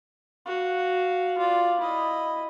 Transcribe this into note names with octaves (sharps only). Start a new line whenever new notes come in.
F#4 F5
F4 D5
E4 D#5